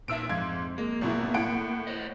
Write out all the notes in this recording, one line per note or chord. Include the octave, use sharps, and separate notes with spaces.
A#2 D#4 E5 A5 E6 D7
F2 G#2 F5 G#6
G#3 A#3
G#1 B2 E4
A2 F#5 D7
C5 C#5 D#5